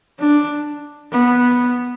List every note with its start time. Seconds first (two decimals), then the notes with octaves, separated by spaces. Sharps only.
0.19 D4
1.12 B3